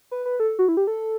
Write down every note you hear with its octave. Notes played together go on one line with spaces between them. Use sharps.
B4
B4
A4
F#4
E4
G4
A4